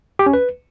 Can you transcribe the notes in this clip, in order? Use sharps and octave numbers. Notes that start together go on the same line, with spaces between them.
G4
C#4
B4